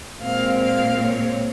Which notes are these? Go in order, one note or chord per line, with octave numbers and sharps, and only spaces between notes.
A#2 G#3 C4 F5
F5
C#5